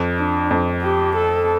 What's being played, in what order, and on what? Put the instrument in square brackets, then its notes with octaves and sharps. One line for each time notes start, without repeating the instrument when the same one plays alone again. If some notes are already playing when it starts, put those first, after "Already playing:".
Already playing: [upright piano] F2
[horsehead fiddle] D4
[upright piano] F2
[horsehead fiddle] G4
A4